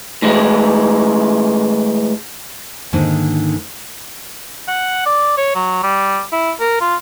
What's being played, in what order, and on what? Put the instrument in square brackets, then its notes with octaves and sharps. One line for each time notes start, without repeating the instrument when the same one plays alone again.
[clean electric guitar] A2 E3 G#3
[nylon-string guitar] G#2 D3 D#3 A#3
[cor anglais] F#5
D5
C#5
F#3
G3
E4
A#4
F4